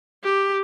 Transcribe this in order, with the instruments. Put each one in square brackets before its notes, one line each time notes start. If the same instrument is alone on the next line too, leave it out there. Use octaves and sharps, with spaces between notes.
[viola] G4